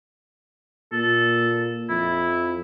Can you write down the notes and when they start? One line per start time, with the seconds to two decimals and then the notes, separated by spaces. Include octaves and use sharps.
0.93 A#2 A4
1.89 F2 E4